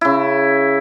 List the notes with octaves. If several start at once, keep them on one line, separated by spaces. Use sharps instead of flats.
C#3 E4